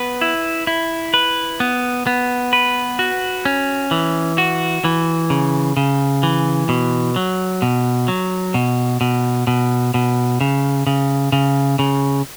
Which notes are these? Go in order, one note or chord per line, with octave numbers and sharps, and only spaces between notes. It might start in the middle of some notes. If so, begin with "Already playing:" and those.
Already playing: B3 B4
E4
E4
B4
B3
B3
B4
F#4
C#4
E3
F#4
E3
C#3
C#3
E3
B2
F#3
B2
F#3
B2
B2
B2
B2
C#3
C#3
C#3
C#3